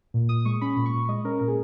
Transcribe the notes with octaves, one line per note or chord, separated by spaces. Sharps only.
A#2
A#2 D#6
G#3 C#6
C#4 B5
A#2
C#6
A#2
G#3 D#5
C#4 A#4
A#2 A#4
G#4